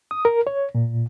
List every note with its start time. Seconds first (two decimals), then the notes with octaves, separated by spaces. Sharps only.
0.11 D#6
0.25 A#4
0.47 C#5
0.75 A#2